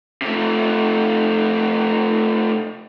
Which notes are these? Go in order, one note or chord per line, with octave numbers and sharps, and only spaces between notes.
C3 A3